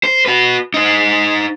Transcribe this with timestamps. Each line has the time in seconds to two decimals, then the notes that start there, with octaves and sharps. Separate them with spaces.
0.04 C5
0.26 F#4 B4
0.74 D#4 C5